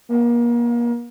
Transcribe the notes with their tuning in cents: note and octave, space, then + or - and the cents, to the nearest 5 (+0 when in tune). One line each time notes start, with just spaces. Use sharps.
A#3 +35